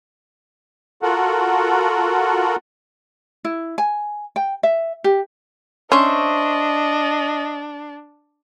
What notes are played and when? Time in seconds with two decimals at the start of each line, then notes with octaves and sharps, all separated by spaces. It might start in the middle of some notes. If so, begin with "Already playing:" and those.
1.02 F4 F#4 A4 A#4 F#5
3.45 E4
3.78 G#5
4.36 G5
4.63 E5
5.04 G4
5.92 C#4 D4 C5 D#5 E5 C#6